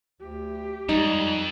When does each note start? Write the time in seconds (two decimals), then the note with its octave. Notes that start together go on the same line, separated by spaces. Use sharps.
0.21 D2 G4
0.89 F2 G3 G#3 D#4